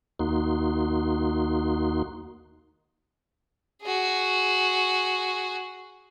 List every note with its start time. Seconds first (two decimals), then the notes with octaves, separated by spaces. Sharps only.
0.19 D#2 A#3 D#4 F#4 C6
3.82 F#4 G#4